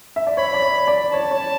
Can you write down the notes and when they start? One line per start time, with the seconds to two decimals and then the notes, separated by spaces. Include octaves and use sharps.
0.16 E5
0.27 D5
0.37 C#5 B5
0.54 D5
0.62 C#5
0.87 D5
1.13 C#5 A5
1.31 C#5